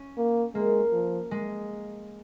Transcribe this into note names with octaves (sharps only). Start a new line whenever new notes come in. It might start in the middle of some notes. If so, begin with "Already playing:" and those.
Already playing: C#4
A#3
G#3 A#3
F3
G#3